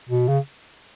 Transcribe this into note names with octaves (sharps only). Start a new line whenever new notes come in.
B2
C#3